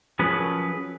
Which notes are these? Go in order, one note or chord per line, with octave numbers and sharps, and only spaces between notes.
F3 F#3 C#4 G#4 A#4 B4